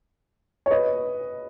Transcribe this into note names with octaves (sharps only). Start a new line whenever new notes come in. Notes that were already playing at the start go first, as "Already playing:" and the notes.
C#5
B4 D#5